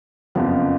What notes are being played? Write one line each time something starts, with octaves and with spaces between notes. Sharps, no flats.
F#1 F2 C#3 F3 B3